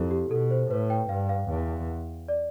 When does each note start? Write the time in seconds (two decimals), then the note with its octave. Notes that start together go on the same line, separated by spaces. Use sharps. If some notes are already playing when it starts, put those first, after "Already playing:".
Already playing: F2 E4 G4 A4
0.11 G4
0.31 B2 A4
0.51 C5
0.70 A2 B4
0.90 G5
1.09 G2 F5
1.29 F5
1.49 E2
2.28 D5